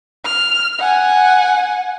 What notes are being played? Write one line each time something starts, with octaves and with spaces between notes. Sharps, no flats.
F6
F#5 G#5